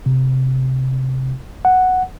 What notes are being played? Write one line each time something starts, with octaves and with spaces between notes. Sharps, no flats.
C3
F#5